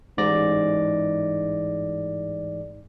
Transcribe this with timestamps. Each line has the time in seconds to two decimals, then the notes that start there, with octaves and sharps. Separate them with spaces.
0.17 A1 G#2 D5 A#6